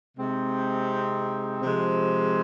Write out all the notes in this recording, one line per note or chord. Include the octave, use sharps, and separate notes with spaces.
C3 G#3 C4 D#4
C3 F3 G#3